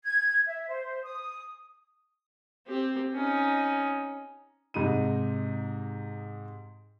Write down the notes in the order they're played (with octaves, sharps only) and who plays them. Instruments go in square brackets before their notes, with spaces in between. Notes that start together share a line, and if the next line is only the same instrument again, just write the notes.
[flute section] G#6
E5
C5
D#6
[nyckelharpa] C4 G4
C#4 D#4
[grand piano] G#2 C3 D#4 D#7